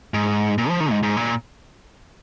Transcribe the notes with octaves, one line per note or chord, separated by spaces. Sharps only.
G#2
A#2
F3
D#3
G#2
G#2
A#2